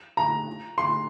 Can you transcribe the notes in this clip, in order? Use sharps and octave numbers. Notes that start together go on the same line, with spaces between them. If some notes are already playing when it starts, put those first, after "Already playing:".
A#5
C6